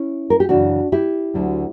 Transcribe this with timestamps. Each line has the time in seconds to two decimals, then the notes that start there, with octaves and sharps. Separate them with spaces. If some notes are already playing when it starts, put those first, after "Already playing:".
Already playing: C#4 E4
0.30 A#4
0.40 G4
0.49 F#2 C#3 E3 D4 F#4
0.92 E4 G4
1.34 D2 D3 F#3